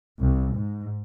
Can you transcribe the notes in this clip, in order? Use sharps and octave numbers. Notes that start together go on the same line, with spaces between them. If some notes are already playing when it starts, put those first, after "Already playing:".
C2
G#2